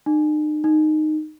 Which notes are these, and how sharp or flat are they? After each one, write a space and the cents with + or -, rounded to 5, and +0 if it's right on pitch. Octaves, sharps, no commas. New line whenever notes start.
D#4 -40
D#4 -15